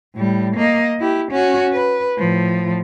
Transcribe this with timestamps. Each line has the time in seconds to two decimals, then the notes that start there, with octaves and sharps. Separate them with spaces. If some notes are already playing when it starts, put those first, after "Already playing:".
0.16 A2 G3
0.56 A#3 D#5
1.00 E4 G4
1.32 C#4 F#4
1.73 B4
2.18 A2 F3